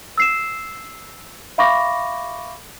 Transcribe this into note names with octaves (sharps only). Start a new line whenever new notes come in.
E6 C7 E7
E5 F5 B5 C#6 D6 A#6